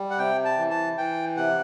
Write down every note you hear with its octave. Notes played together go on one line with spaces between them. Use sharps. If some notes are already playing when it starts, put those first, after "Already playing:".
Already playing: G3
F#5
C3 G5
A5
E3
A5
E3 G5
C3 F#5